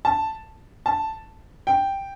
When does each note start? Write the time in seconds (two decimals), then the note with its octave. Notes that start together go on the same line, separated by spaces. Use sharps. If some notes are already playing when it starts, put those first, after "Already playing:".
0.05 A5
0.86 A5
1.67 G5